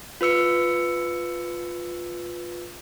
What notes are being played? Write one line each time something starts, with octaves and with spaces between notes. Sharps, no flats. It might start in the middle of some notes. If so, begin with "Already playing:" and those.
F4 B4 E6 C#7